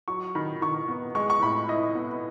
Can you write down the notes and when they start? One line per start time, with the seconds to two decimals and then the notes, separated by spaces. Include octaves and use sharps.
0.08 F#3 C#6
0.35 D#3 B5
0.61 D#3 C#6
0.88 B3
1.15 G#3 C#6
1.30 C#6
1.42 A2 B5
1.68 E4 D#5
1.95 B3